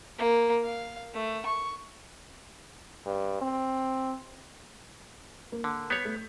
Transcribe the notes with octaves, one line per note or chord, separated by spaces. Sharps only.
A#3
F5
A3
C#6
G2
C4
A#3
D3
B3 C#5 G6 B6 C7
A3